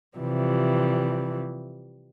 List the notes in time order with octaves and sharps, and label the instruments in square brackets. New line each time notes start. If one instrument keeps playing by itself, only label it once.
[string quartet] C3 E3 F3 G3